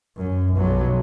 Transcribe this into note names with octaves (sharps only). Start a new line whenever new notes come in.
F#2
B1 F#3